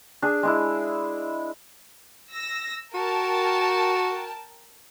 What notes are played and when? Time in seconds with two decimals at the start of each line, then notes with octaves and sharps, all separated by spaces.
0.22 D4 G#4
0.43 G#3 D4 E4
2.32 E6 A#6
2.95 F#4 A#4 G5 A5